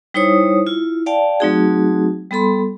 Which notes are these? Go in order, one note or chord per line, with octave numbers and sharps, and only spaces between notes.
G3 D#4 E4 C5 C#5 D#6
E4 F4
D5 F5 G5 A5
F#3 A3 C4 D#4 F#4 G#4
G3 B3 A4 B5 C6